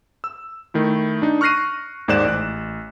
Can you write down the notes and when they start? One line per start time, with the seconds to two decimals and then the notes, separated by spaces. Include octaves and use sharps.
0.24 E6
0.74 D#3 A3 E4
1.22 D4 D#4
1.41 C#6 F6 F#6 A#6 C7 D#7
2.08 D#2 G#2 C5 D5 F#6 E7
2.24 A1 F#6